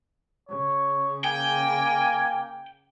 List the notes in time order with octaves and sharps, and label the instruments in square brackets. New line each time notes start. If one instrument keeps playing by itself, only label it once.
[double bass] C#3 [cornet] C#5
[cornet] A#3 [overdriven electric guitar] G5 [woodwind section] G#5